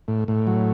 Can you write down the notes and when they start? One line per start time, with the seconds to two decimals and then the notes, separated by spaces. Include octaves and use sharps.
0.08 A2
0.28 A2
0.47 F#3